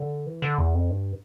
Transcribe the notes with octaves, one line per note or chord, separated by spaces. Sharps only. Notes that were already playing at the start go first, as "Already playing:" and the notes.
Already playing: D3
E3
D3
E2
F2
G2